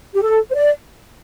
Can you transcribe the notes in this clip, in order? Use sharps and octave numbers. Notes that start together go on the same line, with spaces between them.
G4
A4
C5
D5